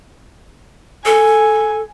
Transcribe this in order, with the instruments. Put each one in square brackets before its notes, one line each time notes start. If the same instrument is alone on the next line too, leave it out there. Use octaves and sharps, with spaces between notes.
[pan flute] A4 [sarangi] G#5